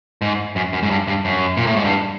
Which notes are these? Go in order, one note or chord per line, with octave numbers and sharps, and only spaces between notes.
G#2
F#2
F#2
G#2
G2
G2
F#2
A#2
A2
G#2
G2